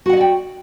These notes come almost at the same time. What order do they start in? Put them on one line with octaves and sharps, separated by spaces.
F#4 F#5 D#5 D5 G5